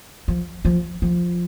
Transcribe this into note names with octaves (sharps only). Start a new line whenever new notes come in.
F3
F3
F3